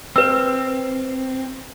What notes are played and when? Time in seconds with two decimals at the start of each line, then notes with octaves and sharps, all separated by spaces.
0.16 C4 B4 E6